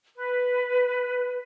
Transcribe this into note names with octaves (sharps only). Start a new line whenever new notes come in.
B4